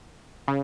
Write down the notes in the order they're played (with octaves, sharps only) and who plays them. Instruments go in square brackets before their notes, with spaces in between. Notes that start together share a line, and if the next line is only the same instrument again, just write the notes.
[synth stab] C#3